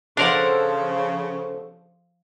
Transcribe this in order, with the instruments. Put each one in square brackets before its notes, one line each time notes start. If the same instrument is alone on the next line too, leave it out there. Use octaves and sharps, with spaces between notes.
[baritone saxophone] C#3 [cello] F3 [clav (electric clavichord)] D4 A#4 D5 [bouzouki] A4 C5 F#5